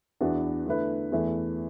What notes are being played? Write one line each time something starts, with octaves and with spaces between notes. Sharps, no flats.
E2 E3 B3 D4 F#4
D3 A3 E4 B4
E2 E3 A3